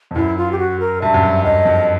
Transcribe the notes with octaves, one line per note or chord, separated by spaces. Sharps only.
F2
F#2 E4
F4
G4
F#4
A#4
G2 E5
F#2
G2
F#2 D#5
F2